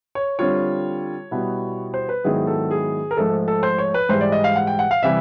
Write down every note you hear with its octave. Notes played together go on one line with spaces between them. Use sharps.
C#5
D3 G3 C4 F4 C#5
B2 G3 B3 E4
C5
B4
G#2 D#3 F#3 B3 E4 G#4
A4
G#4
A#4
G#2 F3 A3 A4
A4
C5
C#5
B4
G#2 E3 G3 C5
D5
D#5
F5
F#5
G5
F#5
F5
C3 E3 G3 E5